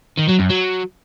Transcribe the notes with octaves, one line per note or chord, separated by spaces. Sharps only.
D#3
F#3
F#2
F#3